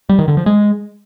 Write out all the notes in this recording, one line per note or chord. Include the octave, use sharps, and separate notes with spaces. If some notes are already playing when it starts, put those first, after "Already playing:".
G3
D#3
D3
F3
G#3